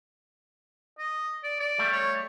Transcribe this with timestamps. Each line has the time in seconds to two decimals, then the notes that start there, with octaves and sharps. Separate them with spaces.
0.98 D#5
1.43 D5
1.60 D5
1.78 G3 A3
1.92 C#5